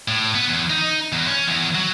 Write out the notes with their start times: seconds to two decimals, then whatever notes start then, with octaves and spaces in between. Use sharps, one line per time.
0.08 A2
0.35 B3
0.49 E2
0.70 D#4
1.12 E2
1.27 C#4
1.48 E2
1.75 F#3